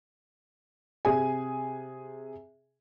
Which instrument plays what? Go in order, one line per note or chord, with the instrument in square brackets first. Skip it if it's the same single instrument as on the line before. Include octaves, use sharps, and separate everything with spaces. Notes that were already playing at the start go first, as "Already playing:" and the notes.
[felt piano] C3 G#4 G#5